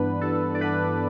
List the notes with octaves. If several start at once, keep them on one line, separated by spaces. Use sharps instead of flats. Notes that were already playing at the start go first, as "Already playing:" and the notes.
Already playing: G2 E3 B3 D4 B4
G2 A4
D5
E3 B3 D4 B4